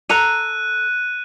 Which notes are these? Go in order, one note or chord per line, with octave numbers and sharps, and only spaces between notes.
A4 A#5 F#6 D#7